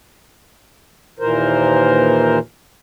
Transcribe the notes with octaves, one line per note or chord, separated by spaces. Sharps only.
D#2 A#2 E3 A#4 C5